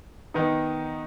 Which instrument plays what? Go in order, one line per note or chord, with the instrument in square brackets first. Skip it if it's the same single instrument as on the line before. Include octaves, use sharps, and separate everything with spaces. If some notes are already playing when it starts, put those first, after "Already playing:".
[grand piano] D#3 B3 D#4